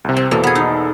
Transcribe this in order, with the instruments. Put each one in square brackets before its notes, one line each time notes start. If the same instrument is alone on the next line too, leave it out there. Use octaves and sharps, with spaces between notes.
[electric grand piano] C2 C3
[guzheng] C4
[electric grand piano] E2 B2 A4 [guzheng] A#3
[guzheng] B3 G#4
D#4